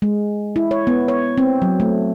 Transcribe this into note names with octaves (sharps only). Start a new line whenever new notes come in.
G#3
E4
C#5
B3
C#5
C4
F#3
A3